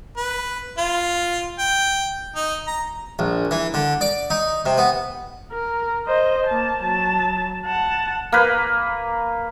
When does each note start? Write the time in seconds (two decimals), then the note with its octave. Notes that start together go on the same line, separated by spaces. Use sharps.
0.17 B4
0.78 F4
1.59 G5
2.36 D#4
2.67 A#5
3.19 A#1
3.51 E3
3.74 D3
4.01 D5
4.30 D#4
4.66 C3
4.78 B3
5.52 A#4
6.07 C5 D#5
6.47 A#3 A5
6.83 F#3 A5
7.66 F#5 A5
8.32 A#3 B4